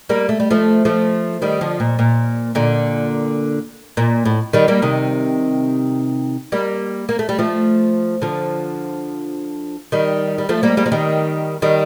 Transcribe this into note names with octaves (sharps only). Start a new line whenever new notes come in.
G3 A#3
A3
G3
F3 A3
F3 A3
D#3 G3
D3 F3
A#2
A#2
A#2 D3
A#2
A2
D#3 G3
G3 A#3
C3 D#3
G3 A#3
A#3
A3
G3
F3 A3
D3 F3
D#3 G3
G3
F3 A3
G3 A#3
G3 A#3
F3
D#3 G3
D#3 G3